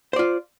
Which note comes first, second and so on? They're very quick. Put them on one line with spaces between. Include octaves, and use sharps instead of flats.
C5 D5 F4